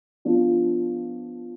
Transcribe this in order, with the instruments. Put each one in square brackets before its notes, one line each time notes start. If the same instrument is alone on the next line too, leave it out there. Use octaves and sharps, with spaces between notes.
[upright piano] F3 B3 D4 F4